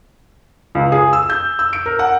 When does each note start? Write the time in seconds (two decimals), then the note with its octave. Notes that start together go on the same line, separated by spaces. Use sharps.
0.75 C#2
0.92 G#4
1.13 E6
1.30 G6
1.59 E6
1.73 D7
1.86 A#4
1.99 F#5